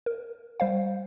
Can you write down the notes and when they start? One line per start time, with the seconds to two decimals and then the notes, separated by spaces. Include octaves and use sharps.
0.06 A#4
0.60 G3 C5 F5